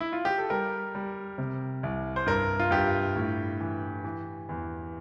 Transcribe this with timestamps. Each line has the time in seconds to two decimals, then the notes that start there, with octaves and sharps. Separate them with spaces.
0.00 E4
0.13 F4
0.25 G4
0.38 A4
0.50 G3 A#4
0.95 G3
1.38 C3
1.83 C2
2.16 C5
2.26 G2 A#4
2.59 F4
2.71 G2 G4
3.16 A2
3.60 E3
4.04 E3
4.49 E2